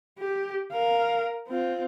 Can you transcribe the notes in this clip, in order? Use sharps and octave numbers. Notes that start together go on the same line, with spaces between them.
G4
A#4 F5
C4 F4